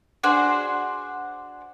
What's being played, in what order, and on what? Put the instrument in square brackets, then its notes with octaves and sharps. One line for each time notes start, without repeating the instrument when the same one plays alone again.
[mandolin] D4 F#4 G#4 C5